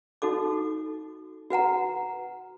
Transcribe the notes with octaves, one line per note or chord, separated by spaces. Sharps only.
D#4 F#4 A4 D6
F#4 B4 F#5 A#5